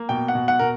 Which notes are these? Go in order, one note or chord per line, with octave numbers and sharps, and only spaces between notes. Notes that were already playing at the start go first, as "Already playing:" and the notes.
Already playing: A#3
B2 G5
F#5
B2
F#5
B2 A#4